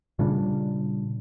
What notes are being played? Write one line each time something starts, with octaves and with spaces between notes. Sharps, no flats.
A#2 C#3 G3 D4